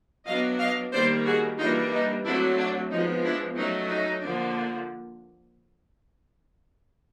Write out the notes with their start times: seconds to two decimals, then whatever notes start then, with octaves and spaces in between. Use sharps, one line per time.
0.26 F#3 B3 D4 D#5 F5
0.59 D#5 F5
0.93 D#3 G3 A#3 C5 D5
1.25 F#4 G#4
1.58 E3 G3 A#3 D4 D#4 F4
1.92 D#4
2.25 F#3 A3 C4 D4 E4
2.58 D4
2.91 F3 G#3 B3 D#4
3.24 D4 E4
3.57 F#3 A3 C#4 D#4
3.90 D#4
4.23 D3 F3 A#3 D4